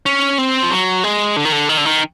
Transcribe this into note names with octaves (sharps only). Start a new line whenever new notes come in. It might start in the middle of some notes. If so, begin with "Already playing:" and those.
C#4
C4
F3
F#3
G#3
D3
D#3
D3
D#3
D3
D#3